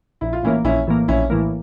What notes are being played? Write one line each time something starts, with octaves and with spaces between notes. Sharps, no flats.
A#1 E4
F4
A2 E3 A#3 C#4 E4
A#1 C#4 E4
A2 E3 A#3
A#1 C#4 E4
A2 E3 A#3